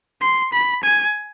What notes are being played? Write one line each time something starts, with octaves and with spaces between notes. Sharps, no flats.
C6
B5
G#5